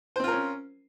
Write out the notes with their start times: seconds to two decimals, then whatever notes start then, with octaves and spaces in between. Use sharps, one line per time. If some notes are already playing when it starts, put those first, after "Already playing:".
0.16 C5
0.20 C4
0.24 F4
0.28 A#4
0.32 C#4